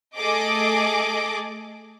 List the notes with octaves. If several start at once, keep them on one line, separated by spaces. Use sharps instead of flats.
A3 G#4 A4 D#5 D6